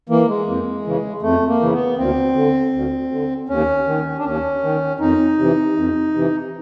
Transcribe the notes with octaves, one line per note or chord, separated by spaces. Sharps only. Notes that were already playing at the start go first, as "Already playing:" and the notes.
E3 A#3
G#3
F2
C#3 E3
F2 A3
A#3
C#3 E3
B3
D2 C4
D3
D2
D3
D#2 C#4
D#3
D4
D#2 C#4
D#3
F2 D#4
C3 E3
F2
C3 E3